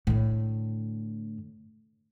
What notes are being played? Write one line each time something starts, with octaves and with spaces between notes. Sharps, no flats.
A2 D3